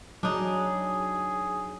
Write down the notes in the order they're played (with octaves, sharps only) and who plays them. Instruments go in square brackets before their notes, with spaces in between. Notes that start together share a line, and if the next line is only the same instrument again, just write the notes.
[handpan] F#3 [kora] D4 D#4 [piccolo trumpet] G#4